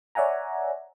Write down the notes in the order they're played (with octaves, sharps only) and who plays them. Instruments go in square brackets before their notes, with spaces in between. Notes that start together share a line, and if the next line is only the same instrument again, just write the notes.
[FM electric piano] C#5 D5 E5 F#5 G#5 A#5